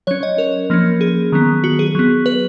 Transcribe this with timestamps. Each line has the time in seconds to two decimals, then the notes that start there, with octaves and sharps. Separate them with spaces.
0.07 F#3 C#4 C#5
0.23 D#5
0.38 A#4
0.70 F3 A#3 C#4
1.01 G#4
1.32 D#3 F#3 B3
1.64 F#4
1.79 G#4
1.95 F#3 B3
2.26 B4